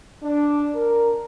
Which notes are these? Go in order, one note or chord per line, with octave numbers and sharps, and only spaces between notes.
D4
A#4